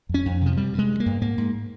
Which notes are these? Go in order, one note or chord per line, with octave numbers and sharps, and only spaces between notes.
F2 C#4
F2
C3 F3
G2 G3
G2
G#3
G2
A#3
G2
G#2 A#3
G#2